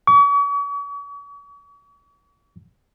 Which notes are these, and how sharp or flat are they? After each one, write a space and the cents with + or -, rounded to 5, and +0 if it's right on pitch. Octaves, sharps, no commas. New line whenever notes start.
C#6 +45